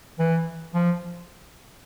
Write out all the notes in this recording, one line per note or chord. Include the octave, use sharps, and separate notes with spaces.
E3
F3